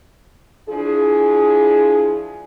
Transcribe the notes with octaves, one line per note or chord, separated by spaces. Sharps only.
F3 D4 E4 G#4